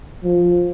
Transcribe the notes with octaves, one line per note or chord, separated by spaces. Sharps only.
F3